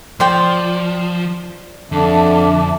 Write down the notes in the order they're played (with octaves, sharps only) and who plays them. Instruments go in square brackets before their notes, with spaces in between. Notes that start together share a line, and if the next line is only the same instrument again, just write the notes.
[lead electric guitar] F3 [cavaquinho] C5 D5 G5
[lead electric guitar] F2 [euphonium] D3 [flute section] E5 A5 D6